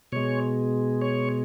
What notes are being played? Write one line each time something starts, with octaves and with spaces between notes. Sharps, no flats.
B2 G#3 C#5
C#5